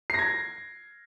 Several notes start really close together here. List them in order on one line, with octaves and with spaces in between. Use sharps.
C7 A#6 G#6